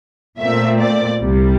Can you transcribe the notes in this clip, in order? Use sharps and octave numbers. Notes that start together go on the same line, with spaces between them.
A#2 A3 C4 E5
D5
C2 C3 G3